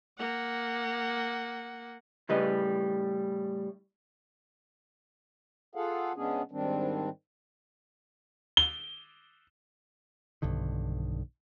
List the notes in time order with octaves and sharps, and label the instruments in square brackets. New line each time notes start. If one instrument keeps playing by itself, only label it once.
[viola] A#3 F#5
[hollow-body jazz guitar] A2 C#3 G3 B4 D#5
[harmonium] F4 G#4 A4 F5 F#5
C#3 G#3 B3 C#4 D4 G#4
G#2 D#3 G3 C4 D4
[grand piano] G7
[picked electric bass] B1 G2 D3 D#3